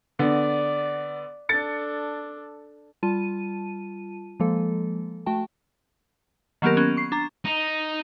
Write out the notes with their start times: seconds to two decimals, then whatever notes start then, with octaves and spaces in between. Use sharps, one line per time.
0.19 D3 B3 D5
1.49 D4 A4 A6 C#7
3.03 G3 F4 A5 D#7
4.40 F3 G#3 A#3 A4
5.26 A3 F#4 G5 A5
6.62 D#3 F#3 A#3 B3 G4 A#4
6.77 B3 C#4
6.97 C#6 C7
7.12 D4 A#5 A6
7.45 D#4